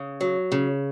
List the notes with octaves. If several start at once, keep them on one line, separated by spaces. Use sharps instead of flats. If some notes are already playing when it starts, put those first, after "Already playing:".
Already playing: C#3
F#3
C#3